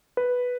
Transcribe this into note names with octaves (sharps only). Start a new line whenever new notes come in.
B4